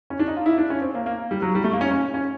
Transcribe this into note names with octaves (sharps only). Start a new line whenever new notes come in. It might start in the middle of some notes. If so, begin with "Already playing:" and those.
C#4
D4
D#4
F4
E4
D4
C#4
C4
A#3
A#3
G3
F#3
G3
A3
A#3
C#4
C#4
C#4